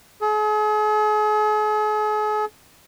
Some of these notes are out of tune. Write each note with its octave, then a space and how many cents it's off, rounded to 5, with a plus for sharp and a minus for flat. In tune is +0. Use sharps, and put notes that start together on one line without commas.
G#4 +40